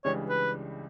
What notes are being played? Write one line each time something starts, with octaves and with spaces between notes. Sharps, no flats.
C#2 C#3 E3 G3 D4 C#5
B4